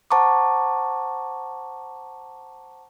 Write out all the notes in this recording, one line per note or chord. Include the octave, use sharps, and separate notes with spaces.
C5 F#5 A5 A#5 C#6 D6